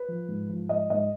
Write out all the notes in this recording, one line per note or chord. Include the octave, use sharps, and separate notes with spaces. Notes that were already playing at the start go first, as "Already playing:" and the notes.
Already playing: B4
F3
G#2
F3
G#2 D#5
G#2 D#5